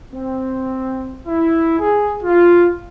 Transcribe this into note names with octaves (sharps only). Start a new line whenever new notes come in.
C4
E4
G#4
F4